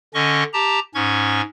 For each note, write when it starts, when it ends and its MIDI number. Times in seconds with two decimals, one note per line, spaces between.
0.14 0.43 50
0.14 0.43 61
0.14 0.43 75
0.14 0.43 85
0.53 0.79 67
0.53 0.79 81
0.53 0.79 82
0.95 1.41 44
0.95 1.41 61
0.95 1.41 85
0.95 1.41 92